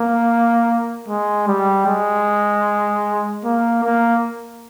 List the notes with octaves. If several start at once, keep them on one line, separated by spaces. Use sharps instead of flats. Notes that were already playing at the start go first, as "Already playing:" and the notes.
Already playing: A#3
G#3
G3
G#3
A#3
A#3